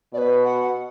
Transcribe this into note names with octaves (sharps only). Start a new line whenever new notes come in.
B2 B4 D5
F#5